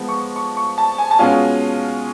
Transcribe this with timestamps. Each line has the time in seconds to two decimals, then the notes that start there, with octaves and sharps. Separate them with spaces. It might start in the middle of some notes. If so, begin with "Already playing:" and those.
Already playing: F3 G#3 B3
0.09 C#6
0.36 C#6
0.57 C#6
0.78 A5
0.98 G#5
1.11 A5
1.19 B2 G#3 C#4 F4 G#5